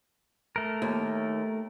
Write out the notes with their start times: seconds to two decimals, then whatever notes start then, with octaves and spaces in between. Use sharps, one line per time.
0.56 A3 A#4
0.82 D#2